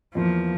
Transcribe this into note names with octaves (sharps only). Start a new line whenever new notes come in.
E2 E3 F3 A#3 F4